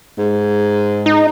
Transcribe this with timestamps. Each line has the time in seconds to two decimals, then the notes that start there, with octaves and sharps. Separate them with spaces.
0.18 G#2
1.06 D#4